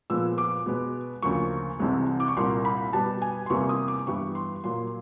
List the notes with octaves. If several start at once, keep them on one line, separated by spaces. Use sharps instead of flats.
A#2 F3 G#3 B3 E6
D6
B2 G#3 B3
D2 C#3 F3 A#3 C#6
C2 C3 E3 G#3
D6
C#6
C2 A#2 G3 A#3 C6
B5
B2 G3 B3 A5
G#5
C6
E2 C3 E3 G3 A#3 C#6
D#6
D6
G2 E3 G3 B3 C#6
C6
A#2 F#3 A#3 C6